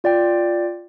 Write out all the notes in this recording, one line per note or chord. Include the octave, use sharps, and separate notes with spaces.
F4 D5 G5